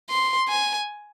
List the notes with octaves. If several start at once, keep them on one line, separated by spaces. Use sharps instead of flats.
C6
G#5